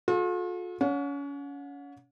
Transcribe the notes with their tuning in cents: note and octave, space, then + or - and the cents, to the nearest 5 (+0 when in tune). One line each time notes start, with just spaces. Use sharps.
F4 +45 A4 -35
C#4 +30 F#5 -35